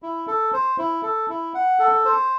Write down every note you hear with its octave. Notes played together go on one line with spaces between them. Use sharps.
E4
A4
C5
E4
A4
E4
F#5
A4
C5